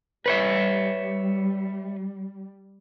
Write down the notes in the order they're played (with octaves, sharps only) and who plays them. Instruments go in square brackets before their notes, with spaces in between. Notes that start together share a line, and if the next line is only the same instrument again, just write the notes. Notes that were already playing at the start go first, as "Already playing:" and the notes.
[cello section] G3 [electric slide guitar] B4 C#5 E5